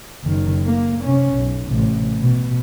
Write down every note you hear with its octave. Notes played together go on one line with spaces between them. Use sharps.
F#1 D#3
A#3
C3 C#4
B1
A1 C3
B2